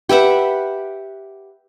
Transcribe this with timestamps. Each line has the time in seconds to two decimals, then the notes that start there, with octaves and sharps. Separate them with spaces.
0.09 G4 B4 E5 F#5